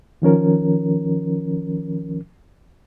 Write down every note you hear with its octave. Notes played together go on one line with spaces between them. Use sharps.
D#3 F3 C#4 A#4